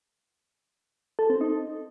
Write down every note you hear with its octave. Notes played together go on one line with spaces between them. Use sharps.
A4
C4
D#4